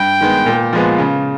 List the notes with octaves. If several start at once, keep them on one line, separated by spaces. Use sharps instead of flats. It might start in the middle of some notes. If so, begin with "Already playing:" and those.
Already playing: G2 G5
D#3 G#3 B3
A#2
F3 G#3 B3
C#3